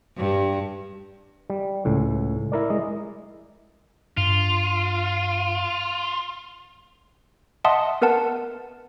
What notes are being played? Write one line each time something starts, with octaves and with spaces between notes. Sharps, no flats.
G2
G3
C#2 A2
E4 A#4 D5
G#3 D#5
G2 F4
D#5 E5 F#5 A5 C6 D#6
B3 A#4 B4 F#5 A5